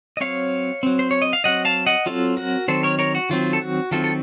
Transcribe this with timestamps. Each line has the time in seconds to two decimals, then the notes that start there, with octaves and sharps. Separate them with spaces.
0.17 D#5
0.21 F#3 C4 C#5 F5
0.83 F#3 C4
0.99 C5
1.11 C#5
1.22 D#5
1.33 F5
1.44 F#3 C4 D#5 F#5
1.65 F5 A5
1.86 D#5 F#5
2.06 F#3 C4 F4 A4
2.37 F#4 A#4
2.68 D#3 F#3 C4 A4 C5
2.83 A#4 C#5
2.99 A#4 C#5
3.15 F#4
3.30 D#3 F#3 C4 F4
3.53 A4
3.62 F#4
3.91 D#3 F#3 C4 F4 A4
4.04 A4